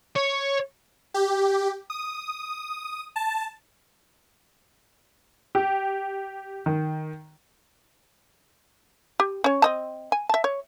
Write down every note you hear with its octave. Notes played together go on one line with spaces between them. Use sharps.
C#5
G4
D#6
A5
G4
D#3
G4
C#4 C#5
C4 D#5 A5
G#5
E5 A5
C#5